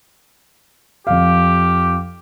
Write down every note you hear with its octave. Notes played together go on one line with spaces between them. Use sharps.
F2 G4 F5